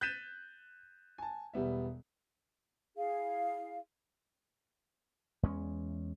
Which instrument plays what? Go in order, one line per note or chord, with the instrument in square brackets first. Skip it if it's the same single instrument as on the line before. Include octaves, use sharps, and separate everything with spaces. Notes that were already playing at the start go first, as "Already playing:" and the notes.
[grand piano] F#6 G6 A6 B6 D#7 E7
G#5 A5
E1 G3 B3 E5
[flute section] E4 G#4 F5
[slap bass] E2 G#3 C#4